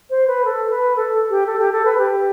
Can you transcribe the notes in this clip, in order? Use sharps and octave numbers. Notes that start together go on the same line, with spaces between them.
C5
B4
A4
B4
A4
G4
A4
G4
A4
B4
G4